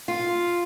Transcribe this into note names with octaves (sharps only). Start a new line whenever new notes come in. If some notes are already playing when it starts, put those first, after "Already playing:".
F4